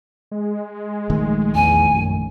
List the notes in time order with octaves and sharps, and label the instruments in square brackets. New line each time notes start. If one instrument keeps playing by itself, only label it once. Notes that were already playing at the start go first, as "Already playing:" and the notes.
[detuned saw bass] G#3
[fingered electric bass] A#1 D#3 A3
[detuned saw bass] E2 [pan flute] G#5
[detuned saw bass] F#2